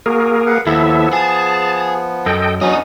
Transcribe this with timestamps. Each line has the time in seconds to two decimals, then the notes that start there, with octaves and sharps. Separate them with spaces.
0.06 A#3 F#4 G#4 A#4
0.46 B4 F5 F#5
0.67 D#2 F3 B3 E4 A4 E5
1.13 G#4 A5
2.26 F#2 A4 D#5 G5
2.61 E2 F#3 B3 C#4 D4 D#5 D#6